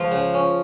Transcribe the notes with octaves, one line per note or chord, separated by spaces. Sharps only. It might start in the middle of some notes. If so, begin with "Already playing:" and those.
Already playing: C#2 F3 F4
C#3
C#4